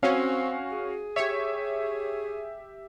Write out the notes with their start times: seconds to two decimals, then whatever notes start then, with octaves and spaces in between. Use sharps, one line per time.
0.03 C4 C#4 F#4 F5
0.72 G#4
1.16 G4 C#5 E5